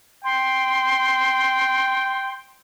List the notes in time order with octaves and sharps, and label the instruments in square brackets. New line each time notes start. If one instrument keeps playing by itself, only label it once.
[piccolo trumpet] G5 [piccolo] C6